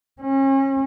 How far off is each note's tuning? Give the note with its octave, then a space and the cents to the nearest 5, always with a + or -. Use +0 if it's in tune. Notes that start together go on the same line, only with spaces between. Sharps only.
C#4 -35